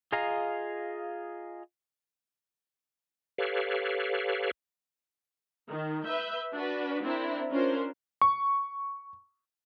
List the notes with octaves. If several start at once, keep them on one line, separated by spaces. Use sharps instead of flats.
F4 G#4 D#5 F5 A#5
G4 A4 B4 C#5 F5
D#3
B4 E5 G6
D4 F#4 B4
C4 D4 E4 A#4
C#4 D4 F4 A#4 C5
C#6